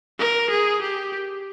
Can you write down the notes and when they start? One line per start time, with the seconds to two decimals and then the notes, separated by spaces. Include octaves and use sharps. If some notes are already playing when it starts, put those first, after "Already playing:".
0.19 A#4
0.50 G#4
0.82 G4